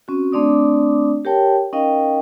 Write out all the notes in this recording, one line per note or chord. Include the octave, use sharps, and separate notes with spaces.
C4 C#4 F#4
A3 C4 D4 D5 D6 D#6
G4 A#4 C#5 G5 A5
C#4 D#4 A#4 D#5 F5 G5